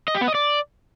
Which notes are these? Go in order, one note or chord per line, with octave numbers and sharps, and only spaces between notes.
D#5
G4
B3
D#5
D5